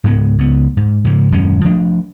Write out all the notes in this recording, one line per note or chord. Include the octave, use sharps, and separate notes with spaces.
C#2 G#2 G#3 B3
C#2 B3
G#2
G#2 C#3 F3
D#1 F#2 G#3 C#4
F3 A3 D4